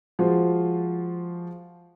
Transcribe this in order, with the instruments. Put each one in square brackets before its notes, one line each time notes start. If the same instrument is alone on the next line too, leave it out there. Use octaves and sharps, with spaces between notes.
[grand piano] F3 G#3 F4 F#4